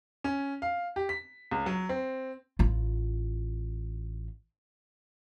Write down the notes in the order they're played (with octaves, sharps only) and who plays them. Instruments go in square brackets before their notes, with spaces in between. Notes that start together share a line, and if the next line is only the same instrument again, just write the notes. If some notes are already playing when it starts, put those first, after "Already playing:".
[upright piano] C#4
F5
G4
B6
C#2
F#3
C4
[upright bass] A1 F4